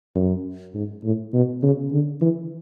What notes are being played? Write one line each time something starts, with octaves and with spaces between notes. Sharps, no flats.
F#2
G#2
A2
B2
C#3
D3
E3